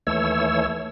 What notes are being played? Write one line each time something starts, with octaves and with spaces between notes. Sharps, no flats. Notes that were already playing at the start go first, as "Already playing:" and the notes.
D#2 E3 A3 C#5 E6